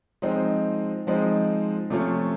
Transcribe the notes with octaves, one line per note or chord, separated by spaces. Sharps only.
F3 G#3 C4 D#4
F3 G#3 C4 D#4
C3 F3 A3 C#4 F4